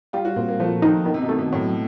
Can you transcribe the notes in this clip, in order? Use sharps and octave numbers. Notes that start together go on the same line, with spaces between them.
G3 F4
F#4
A#2 C4
A#3
F3 A3
D#3 D#4
B2 D#3
C3
B2
C3 A3
B2
A2 F#3